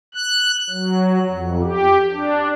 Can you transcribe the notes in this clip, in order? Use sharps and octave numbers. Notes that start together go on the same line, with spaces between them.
F#6
F#3
F2
G4
D4